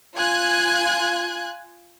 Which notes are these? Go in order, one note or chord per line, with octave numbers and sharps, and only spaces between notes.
F4 G#5 F#6 G#6